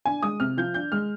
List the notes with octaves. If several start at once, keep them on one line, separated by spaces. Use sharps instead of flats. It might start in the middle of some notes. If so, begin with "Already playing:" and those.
D4 G#5
G#3 D#6
C3 F6
F3 G6
D4 G6
G#3 F6